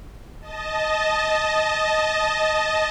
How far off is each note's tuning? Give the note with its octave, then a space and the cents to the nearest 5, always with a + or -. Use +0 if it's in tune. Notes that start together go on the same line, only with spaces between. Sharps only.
D#5 +0 A5 -10